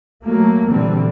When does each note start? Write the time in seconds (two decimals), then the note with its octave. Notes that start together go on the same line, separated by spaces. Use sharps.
0.23 F#3 A3 A#3
0.69 A#2 D3 E3 G3 C4